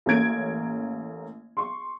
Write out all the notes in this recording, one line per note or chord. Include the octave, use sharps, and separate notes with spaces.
A1 A3 A#3 C#4 G#6 D7
C6 C#6